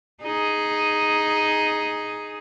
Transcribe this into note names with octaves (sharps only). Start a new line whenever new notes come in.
D#4 G#4